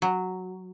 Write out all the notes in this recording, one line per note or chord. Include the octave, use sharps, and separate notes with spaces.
F#3